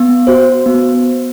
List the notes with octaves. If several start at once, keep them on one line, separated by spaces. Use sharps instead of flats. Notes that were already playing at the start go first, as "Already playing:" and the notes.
Already playing: B3
F#4 C5
B3